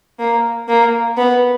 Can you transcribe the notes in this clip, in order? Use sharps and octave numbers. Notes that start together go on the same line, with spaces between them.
A#3
A#3
B3